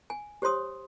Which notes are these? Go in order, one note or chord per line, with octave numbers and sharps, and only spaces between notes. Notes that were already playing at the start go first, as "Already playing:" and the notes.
G#5
G4 C5 C#5 C6 D#6